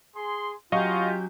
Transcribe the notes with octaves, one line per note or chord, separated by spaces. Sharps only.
G#4 C6
F#3 C#4 F4 G4 D#5 F5 C#6 G6